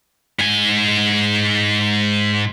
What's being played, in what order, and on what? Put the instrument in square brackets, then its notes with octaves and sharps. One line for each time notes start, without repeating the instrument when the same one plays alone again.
[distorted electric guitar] G#2 G#5